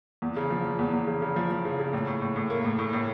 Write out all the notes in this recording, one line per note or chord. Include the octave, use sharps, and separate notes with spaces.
E2
C#3
F3
F3
E2
E2
C#3
C#3
F3
F3
C#3
C#3
A2
A2
A2
A2
A#3
A2
A2
A2